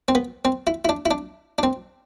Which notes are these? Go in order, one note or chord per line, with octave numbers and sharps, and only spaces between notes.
C4
B3
C4
E4
E4
D4
E4
D4
D4
C4